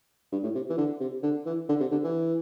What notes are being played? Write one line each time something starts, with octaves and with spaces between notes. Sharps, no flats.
G2
A2
C3
E3
D3
C3
D3
E3
D3
C3
D3
E3